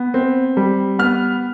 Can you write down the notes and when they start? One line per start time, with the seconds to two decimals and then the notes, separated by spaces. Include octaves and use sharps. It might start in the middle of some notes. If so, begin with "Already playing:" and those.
Already playing: B3
0.14 C4
0.57 G3
0.99 B3 F6